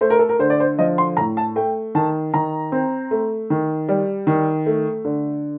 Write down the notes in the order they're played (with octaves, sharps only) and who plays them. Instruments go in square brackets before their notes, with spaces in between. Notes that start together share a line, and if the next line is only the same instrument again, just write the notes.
[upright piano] A3 C5
A#4
A4
A#4
D3 C5
D5
C5
F3 D#5
C6
A2 A#5
A5
A3 G5
D#3 A5
D#3 A#5
C4
A3
D#3
G3
D#3
A3
D3